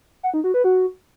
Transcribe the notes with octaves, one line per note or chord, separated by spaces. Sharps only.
F#5
D#4
F#4
B4
F#4